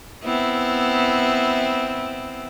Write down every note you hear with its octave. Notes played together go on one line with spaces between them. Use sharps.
B3 C4 E4